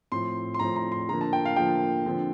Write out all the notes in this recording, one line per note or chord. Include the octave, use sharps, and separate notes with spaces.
A2 F3 C4 C6
C6
A2 F3 C4 A#5
A#5
C6
D3 F3 A#3 A#5
A5
G5
F5
D3 F3 A#3 G5
D3 F3 C4